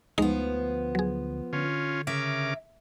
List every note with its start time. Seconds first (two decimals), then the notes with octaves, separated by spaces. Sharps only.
0.18 D2 F3 G#3 B3 D#4
0.95 F#3 G#4
1.53 D3 C#4 F4
2.07 C#3 A#4 E5 D6